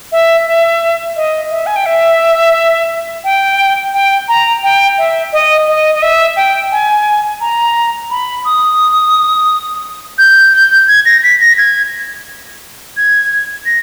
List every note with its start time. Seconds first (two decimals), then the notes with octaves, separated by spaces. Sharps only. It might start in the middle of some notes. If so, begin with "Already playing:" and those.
0.12 E5
0.46 E5
1.16 D#5
1.51 E5
1.66 G#5
1.76 G5
1.86 E5
3.24 G5
3.94 G5
4.28 A#5
4.63 G5
4.98 E5
5.33 D#5
5.67 D#5
5.95 D#5
6.02 E5
6.36 G5
6.72 G#5
7.41 A#5
8.10 B5
8.45 D#6
10.18 G6
10.53 G6
10.88 G#6
11.05 A#6
11.23 B6
11.41 A#6
11.58 G#6
12.97 G#6
13.66 A#6